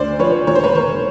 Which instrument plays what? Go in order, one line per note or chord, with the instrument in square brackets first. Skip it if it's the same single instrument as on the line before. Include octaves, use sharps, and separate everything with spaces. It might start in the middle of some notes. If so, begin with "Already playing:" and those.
Already playing: [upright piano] D2 C5 D5
F3 B4 C#5
E1 C#5
C5
B4 C#5
E1 A#4 C5